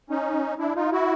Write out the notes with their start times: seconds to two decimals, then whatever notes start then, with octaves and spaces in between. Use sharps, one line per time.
0.10 C#4 D#4
0.59 D4 E4
0.75 D#4 F4
0.91 E4 F#4